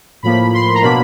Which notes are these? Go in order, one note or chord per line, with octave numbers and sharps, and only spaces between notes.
A2 F3 A#3 B5
C6
A#5
B2 F#3 A#3 D4 B5